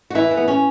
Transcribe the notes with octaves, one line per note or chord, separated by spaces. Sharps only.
F#4
E3 E4
E3
B3
C#4